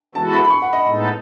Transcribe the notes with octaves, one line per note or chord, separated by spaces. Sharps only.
E3 G#3 B3 F#4 A4 A5
B5
B5
C#6
F#5
D#5
A2 G#3 B3 D#4 A4